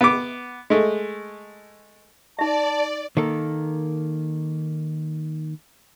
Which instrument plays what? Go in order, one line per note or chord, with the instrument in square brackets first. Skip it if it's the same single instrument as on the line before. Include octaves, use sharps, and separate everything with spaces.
[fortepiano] B3 D6
G#3 A3
[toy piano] D#4 E5 [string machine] D5 [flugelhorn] A5
[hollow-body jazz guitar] D#3 A#3 A4